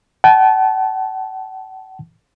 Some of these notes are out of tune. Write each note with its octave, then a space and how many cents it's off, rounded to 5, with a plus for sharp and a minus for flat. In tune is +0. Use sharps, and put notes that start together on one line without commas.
F#5 +40 A5 -25